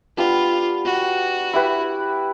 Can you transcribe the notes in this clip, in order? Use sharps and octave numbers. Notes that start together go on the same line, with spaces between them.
B3 D4 F4 G4
F#4
E4 G4 B4